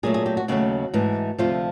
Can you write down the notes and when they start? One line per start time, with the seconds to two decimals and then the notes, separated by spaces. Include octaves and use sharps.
0.03 A#2 F#3 A3 G#4
0.14 G#4
0.26 G4
0.37 F#4
0.48 D#2 C#3 F#3 A3 F#4
0.94 G#2 E3 A3
1.38 D2 C3 F3 A3 F4